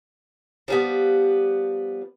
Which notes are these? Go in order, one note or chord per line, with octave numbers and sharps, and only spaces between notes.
F3 G3 B3